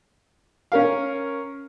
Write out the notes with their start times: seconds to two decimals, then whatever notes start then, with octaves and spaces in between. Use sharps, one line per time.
0.72 C#4 A#4 F5